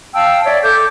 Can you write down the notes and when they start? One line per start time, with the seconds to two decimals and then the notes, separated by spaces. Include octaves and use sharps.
0.14 F5 G5 A5 E6
0.45 C#5 D5 E5
0.63 A4 D6 G6